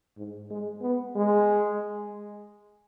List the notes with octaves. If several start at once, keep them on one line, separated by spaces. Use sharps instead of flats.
G#2
G#3
B3
G#3